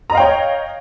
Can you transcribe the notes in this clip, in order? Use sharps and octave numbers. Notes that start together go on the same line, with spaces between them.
C#5 D#5 F5 G5 A#5